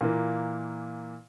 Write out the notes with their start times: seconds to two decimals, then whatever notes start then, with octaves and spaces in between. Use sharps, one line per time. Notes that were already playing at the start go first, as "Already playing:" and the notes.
0.01 A#2 E3 A#3